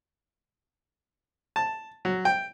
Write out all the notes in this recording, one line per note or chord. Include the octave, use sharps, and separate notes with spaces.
A5
F#3
G5